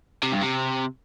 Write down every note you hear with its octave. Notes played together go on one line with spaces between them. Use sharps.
C3
G2
C3